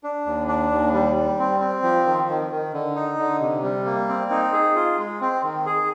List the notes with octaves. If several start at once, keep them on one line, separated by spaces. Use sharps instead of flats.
D4
D#2
D4
D#2
G3
G3
C4
C4
F3
D#3
D#3
D#3
D3
D#4
D3
C3
G3
A#3
C4
D#4
G#4
F4
G#3
C4
D#3
G#4